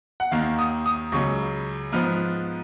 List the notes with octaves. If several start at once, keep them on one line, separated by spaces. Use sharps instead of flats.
F#5
D#2 D#3 A#3 F5
D#6
D#6
C#2 C#3 F#3 C#6
G#2 F3 B3 F6